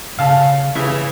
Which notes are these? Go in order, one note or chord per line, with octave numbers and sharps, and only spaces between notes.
C#3 F5 A5
C#3 E4 B4 E5